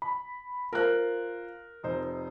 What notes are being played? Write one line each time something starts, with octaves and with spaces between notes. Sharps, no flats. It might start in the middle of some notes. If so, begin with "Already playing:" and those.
B5
F4 A#4 C5 F#6
F1 D#4 C5